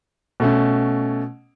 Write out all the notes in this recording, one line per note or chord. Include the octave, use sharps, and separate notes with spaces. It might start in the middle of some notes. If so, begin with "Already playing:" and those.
B2 A3 C#4